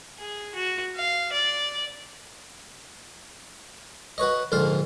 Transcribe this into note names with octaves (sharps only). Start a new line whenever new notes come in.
G#4
F#4
F5
D5
F#4 B4 C#5 D#5
A#1 G#2 D3 F4 F5